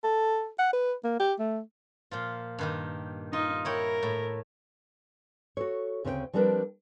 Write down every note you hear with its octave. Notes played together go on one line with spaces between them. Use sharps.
A4
F#5
B4
A#3
G4
A3
A#2 F3 F4
G2 D#3 G4
D#4 F4
E4 A#4 C#5 G5
A2
F#4 A4 C#5
D2 C#3 C4 C#4 A4 G5
F3 G3 C4 D4 A#4 B4